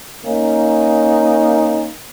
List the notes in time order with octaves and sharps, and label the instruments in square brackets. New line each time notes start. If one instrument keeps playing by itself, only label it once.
[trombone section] A#3 C#4 D#4